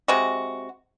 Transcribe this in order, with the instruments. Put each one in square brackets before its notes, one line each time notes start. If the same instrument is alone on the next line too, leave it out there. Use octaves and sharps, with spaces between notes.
[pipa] C3 G#3 F#4